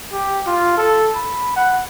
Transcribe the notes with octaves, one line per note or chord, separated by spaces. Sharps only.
G4
F4
A4
B5
F#5